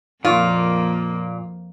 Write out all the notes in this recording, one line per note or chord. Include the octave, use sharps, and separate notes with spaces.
F2 A#2 F3 A#3 F4